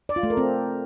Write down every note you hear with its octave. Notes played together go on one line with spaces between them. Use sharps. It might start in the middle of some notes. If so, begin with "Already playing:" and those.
D5
F4
A3
A#4
C4